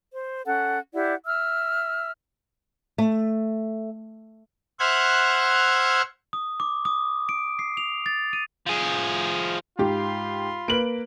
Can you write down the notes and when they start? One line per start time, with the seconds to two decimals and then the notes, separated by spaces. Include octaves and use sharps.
0.13 C5
0.45 C#4 A4 F#5
0.94 E4 G4 D5 F#5
1.26 E5 E6 F6
2.98 A3
4.80 C5 E5 F#5 F6 F#6 G#6
6.33 D#6
6.60 D6
6.85 D#6
7.29 D7
7.59 C7
7.77 F7
8.06 A6
8.33 D#7
8.67 F3 G#4
9.79 G#2 F4 G4 B5 C6
10.68 A#3 B4 D7 F#7